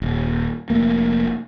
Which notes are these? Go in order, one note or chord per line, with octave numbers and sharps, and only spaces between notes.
D#1
F1 F2 A3 A#3